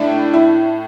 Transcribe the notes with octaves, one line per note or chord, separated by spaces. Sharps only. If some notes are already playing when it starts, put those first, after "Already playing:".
Already playing: A2 A3 D4 E4
E4